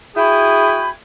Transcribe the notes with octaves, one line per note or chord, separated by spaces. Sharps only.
E4 F#4 G#4 G5 G#5 B5